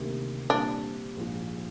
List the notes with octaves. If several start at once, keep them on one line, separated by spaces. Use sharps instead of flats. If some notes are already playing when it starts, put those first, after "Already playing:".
Already playing: D2 C3 D#3 A#3
A#2 G3 C4 D4 G4
A#1 G#2 F3 G#3